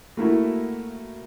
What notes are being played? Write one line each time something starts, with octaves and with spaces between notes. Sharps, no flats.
A3 A#3 E4 F#4